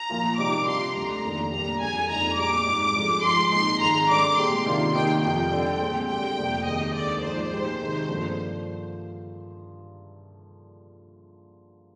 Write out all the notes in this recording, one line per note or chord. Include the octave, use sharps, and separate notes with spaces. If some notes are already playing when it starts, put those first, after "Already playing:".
Already playing: A#5
A#2 F3 A#3 F4
C3 G3 C4 D#4 G4 D6
C3 G3 D4 F4 C6
D2 D3 G3 A#5
F2 D#3 A#3 D4 G4
A#2 G3 A#3 D4 G4 A#5
F2 D3 G#3 G#5
F2 D3 G3 A#3 D#4 A#5
A#2 G#3 D4 G4 D6
G#2 G3 C4 D#4 G4
D3 F3 G#3
G#2 F3 G#3 C6
A#2 G#3 C4 D#4 C6
G#2 D#3 G#3 C4 A#5
D3 G3 D4 G4 D6
A#2 G#3 C4 G4 C6
C3 D#3 A#3 D4 F4
C3 D#3 A#3 D#4 G4 G5
F2 C3 F3 G5
D3 G3 C4
A#2 G#3 C4
D3 G3 C4 G4 G5
F2 C3 G3 A#3
D#2 D#3 G#3 C4 D#5
D#2 D3 G#3 D5
G#2 F3 A#3 D#4 C5
A#2 G#3 D#4 G4
C3 D#3 G#3
G2 D3 F3 A#3